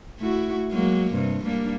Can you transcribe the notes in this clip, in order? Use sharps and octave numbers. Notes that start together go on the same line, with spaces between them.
A3 E4 F#4
F#3 G#3 A#3
G2 C3
G3 A#3 D4